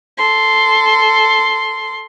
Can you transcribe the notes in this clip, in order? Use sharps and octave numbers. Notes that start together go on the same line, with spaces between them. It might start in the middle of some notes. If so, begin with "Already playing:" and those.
A4 C6